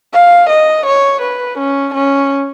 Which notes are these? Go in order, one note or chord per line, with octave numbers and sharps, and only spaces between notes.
F5
D#5
C#5
B4
C#4
C#4